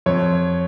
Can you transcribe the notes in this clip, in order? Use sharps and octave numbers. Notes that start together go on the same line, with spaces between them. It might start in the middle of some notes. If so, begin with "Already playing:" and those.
F2 C#5